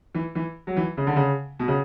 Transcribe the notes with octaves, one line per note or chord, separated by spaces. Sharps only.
E3
E3
F#3
E3
C#3
D3
C#3
B2
C#3